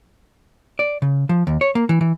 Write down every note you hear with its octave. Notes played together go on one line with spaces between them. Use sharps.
D5
C#3
F3
D#2
C#5
A#3
E3
E3